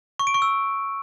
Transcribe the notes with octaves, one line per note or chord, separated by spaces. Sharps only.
C#6
D7
C#6
E6